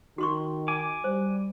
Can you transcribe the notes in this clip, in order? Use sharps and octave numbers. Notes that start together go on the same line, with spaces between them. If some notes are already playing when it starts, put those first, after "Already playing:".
D#3 D#4 F#4 C6 C#6
G#5 D6
G3 C5